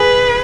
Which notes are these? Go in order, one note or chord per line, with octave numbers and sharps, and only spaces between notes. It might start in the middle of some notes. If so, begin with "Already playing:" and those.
Already playing: G#4 B4